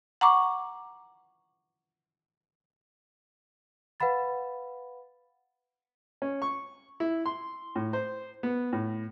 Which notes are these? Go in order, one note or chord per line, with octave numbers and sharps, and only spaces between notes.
F#5 A#5 C#6 D6
B4 F5 F#5 B5 A6
C#4
C#6
E4
C6
A2
C5
B3
A2